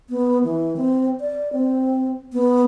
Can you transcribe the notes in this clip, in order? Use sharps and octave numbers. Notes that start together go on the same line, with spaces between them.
B3
E3
C4
D5
C4
B3